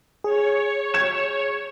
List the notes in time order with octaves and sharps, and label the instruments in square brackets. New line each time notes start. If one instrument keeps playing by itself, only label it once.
[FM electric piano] G#4 [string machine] C#5
[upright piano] G#6 E7